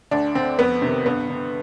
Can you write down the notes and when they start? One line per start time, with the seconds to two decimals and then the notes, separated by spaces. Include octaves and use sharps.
0.11 D2 D4
0.35 D3 C4
0.59 F2 B3
0.82 C3 D#3
1.06 G2 B3
1.30 D3